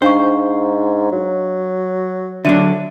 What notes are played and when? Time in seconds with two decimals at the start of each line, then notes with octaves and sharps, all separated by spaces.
0.02 G#2 D4 C5 F5 C#6
1.12 F#3
2.45 D3 F#3 D4 E5 D#7